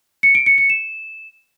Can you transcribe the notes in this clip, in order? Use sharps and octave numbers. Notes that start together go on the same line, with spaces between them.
C#7
D7
C#7
C#7
E7